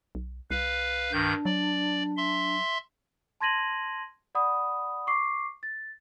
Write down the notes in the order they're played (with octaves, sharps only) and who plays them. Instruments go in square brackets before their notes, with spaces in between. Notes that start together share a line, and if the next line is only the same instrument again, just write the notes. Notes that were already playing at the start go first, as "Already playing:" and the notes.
[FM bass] B1
[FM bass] C2 [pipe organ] B4 F5
[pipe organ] G2 D#3 G6 [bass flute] D4
[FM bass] F#3 [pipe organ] D5
[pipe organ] E5 C6
[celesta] A5 C6 G#6 A#6 D#7 F#7
D5 F#5 B5 D#6
C#6 D6 C7
A6